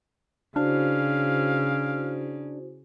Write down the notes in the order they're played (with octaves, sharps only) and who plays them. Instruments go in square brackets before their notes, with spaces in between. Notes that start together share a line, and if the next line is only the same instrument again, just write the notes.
[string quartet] C#3 [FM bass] D4 [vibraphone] E4 F#4 C5 [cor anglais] F5